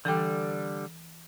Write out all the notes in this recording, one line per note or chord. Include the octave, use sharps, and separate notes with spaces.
D3 E3 G3 A4 G5